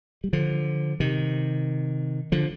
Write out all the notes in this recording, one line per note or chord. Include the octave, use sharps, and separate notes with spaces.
G3
D3 F3
C3 D#3
D3 F3